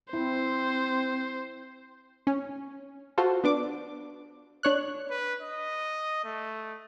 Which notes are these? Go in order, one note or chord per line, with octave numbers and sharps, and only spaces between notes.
C4 E4 C5
C#4
F4 F#4 A4 C5
B3 D4 D6
D4 C#5 F#6
B4
D#5
A3